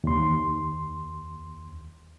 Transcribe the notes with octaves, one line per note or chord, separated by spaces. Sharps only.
D#2 C6